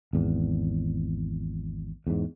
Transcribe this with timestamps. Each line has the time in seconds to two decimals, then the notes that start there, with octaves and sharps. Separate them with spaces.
0.13 G#1 E2
2.07 E2 G#2